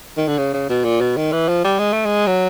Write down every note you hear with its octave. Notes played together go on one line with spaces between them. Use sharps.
D#3
D3
C#3
C#3
B2
A#2
B2
D#3
E3
F3
G3
G#3
A3
G#3
F#3